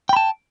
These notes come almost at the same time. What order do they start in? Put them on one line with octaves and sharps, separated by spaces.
G5 B5 A5